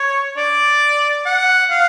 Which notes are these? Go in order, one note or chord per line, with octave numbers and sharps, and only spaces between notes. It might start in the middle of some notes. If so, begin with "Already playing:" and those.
Already playing: C#5
D5
F#5
F5